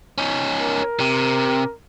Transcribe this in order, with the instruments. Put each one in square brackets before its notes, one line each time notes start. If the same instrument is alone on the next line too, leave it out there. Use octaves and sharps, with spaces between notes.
[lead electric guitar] C#4 D#4
[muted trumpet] A#4
[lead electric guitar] C3